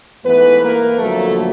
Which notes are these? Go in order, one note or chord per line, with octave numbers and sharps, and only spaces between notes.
G#2 E3 A3 B3 B4
A#3 A#4
F2 D3 F#3 A3 A#3 A4